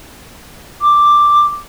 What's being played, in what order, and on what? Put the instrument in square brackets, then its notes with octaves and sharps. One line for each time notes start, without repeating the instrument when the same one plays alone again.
[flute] D6